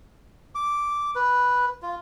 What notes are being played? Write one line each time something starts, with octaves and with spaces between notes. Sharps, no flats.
D6
B4
F4